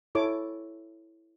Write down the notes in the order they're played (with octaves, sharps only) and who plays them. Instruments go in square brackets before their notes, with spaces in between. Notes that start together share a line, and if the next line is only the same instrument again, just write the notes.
[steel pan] E4 A4 C#5 D6